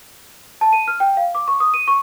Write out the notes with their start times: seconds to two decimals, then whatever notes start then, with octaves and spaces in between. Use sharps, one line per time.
0.61 A5
0.73 D#7
0.88 F6
1.00 G5
1.17 F5
1.35 D6
1.48 C#6
1.60 D#6
1.74 D#7
1.88 C#6